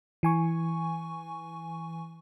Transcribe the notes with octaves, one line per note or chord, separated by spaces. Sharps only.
E3 G#5 C#6